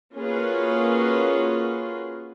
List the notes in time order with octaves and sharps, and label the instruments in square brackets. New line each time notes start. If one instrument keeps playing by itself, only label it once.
[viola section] A#3 C#4 F4 F#4 G#4 B4